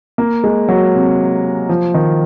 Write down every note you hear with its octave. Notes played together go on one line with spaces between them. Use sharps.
A#3
G#3
F#3
C3
F3
D#3